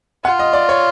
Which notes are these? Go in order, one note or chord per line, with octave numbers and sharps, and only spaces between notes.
F4 F#5
D#5
D5
C#5